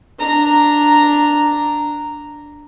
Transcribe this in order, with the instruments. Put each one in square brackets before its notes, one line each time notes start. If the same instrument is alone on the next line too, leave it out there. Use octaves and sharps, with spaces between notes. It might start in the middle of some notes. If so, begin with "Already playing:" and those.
[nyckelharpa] D4 A#5